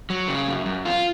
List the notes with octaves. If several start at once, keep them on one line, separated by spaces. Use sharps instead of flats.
F#3
C#3
F#2
F#2
F4